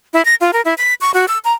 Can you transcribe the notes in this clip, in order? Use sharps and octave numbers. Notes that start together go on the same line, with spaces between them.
E4
A#6
F4
A#4
E4
B6
C#6
F#4
E6
A#5